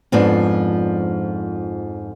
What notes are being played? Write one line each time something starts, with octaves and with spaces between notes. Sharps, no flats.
F2 G#2 F3 B3 D4